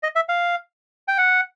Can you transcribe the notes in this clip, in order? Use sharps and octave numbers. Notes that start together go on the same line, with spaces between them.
D#5
E5
F5
G5
F#5